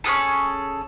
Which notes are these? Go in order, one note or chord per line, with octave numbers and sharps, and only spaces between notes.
C#4 F4 G#4 A4